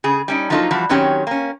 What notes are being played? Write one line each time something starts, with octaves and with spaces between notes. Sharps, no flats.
C#3 G#4
G3 C#4 D#4
F3 F#3 A#3 D#4 F4 A4
E3 F3 G3 F#4
D#3 F#3 C4 C#4 G4 C#5
A#3 C#4